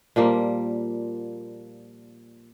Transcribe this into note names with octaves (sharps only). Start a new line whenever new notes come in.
A#2 F3 G3 A#3